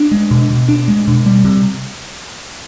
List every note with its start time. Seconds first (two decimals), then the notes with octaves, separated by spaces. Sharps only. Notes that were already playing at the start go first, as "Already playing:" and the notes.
Already playing: D4
0.11 G#3
0.31 B2
0.50 B2
0.68 D4
0.88 G#3
1.08 B2
1.26 G3
1.45 C3